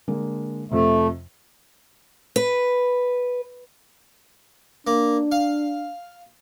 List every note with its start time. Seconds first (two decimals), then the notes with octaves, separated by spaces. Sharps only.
0.08 D3 G#3 A#3
0.71 F2 C3 A3
2.36 B4
4.87 A#3 D4
5.32 F5